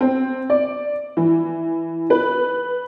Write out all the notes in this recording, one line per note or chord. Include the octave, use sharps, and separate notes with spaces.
C4
D5
E3
B4